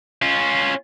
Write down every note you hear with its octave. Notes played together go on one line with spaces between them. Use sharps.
C#4 F4